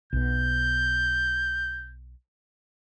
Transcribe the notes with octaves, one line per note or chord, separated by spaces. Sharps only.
B1 B2 G6